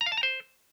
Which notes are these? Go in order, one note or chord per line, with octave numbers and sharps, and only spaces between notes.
A#5
F5
A5
A#5
C5